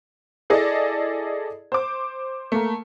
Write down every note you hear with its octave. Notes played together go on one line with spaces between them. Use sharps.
E4 G#4 A4 D5 D#5
C5 D6
A3 A#3